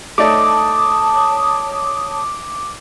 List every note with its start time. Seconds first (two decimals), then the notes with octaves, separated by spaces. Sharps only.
0.18 A3 D#4 C#5 D5 A5 D6 D#6